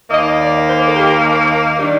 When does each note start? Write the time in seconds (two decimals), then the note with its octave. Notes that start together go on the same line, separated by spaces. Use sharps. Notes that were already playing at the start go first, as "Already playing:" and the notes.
0.10 D#2 D#3 A#3 D#5
0.39 D5
0.67 C5
0.86 A4
0.95 G4
1.79 D#3 G3 D4